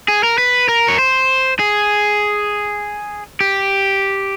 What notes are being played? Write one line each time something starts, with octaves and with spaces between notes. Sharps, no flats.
G#4
A#4
B4
A#4
C#5
C5
G#4
G4